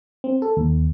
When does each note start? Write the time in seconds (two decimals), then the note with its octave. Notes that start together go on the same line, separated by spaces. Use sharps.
0.24 C4
0.42 A4
0.57 D#2